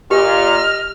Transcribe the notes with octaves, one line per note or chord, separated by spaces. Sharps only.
A#2 G4 D#5 F6